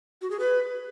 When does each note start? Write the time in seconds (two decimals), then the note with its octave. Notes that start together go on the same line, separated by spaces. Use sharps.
0.22 F#4
0.31 G#4
0.39 B4